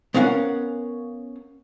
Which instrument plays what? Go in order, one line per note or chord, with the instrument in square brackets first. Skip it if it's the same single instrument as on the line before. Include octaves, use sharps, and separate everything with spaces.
[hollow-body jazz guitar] B3 C#4 A#4 F5 F#5